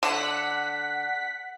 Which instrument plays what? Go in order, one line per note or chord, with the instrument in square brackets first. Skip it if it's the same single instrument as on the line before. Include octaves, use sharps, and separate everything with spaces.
[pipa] D3 [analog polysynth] F#5 B6